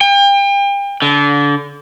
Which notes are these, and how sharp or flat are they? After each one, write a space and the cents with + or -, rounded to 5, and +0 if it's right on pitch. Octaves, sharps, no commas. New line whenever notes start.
G5 +35
D3 -30